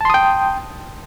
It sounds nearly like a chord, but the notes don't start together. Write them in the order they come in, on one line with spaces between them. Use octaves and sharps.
A5 C6 D#6 G5